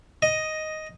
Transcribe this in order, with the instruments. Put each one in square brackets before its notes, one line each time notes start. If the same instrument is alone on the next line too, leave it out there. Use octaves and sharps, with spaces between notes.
[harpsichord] D#5